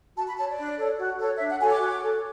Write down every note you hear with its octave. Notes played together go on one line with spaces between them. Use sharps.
F#4 A5
B5
C#5 A5
D5
D4
A4 C#5
F#4
A4 C#5
D4 E5
F#5
F#4 A4 C#5 G#5
D6
F#4
A4 C#5